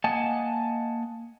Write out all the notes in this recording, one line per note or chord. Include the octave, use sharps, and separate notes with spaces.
A#3 D#5 F#5 G#5 A5